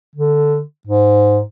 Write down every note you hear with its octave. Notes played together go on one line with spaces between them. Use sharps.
D3
G#2